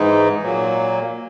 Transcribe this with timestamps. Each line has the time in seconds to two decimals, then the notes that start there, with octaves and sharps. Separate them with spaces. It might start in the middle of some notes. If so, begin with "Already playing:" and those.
Already playing: G#2 E3 G#3 D#4
0.43 A#2 F#3 A#3